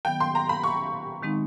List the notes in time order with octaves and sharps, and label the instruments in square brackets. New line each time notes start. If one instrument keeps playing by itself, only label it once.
[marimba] D#3 F#3 B3 [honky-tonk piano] G5
[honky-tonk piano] C6
A#5
B5
C#6
[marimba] D#3 G#3 C4 D#4